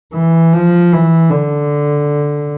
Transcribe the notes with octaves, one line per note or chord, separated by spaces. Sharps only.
E3
F3
E3
D3